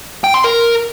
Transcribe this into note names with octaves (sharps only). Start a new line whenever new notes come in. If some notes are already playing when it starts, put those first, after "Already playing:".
G5
C6
A#4